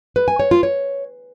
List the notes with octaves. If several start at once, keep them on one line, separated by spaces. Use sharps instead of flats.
B4
G#5
C#5
F4
C#5